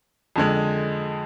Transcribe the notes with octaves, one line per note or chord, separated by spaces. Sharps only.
F2 D3 G#3